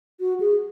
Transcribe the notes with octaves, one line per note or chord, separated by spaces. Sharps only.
F#4
G#4